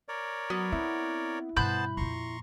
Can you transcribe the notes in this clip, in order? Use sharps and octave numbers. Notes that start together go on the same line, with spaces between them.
A#4 C#5 D5
F#3 B3
C4 E4
G2 B2 B3 C5 A5 B5 F#6 G6
F2 A#2 A#5 C6 C#6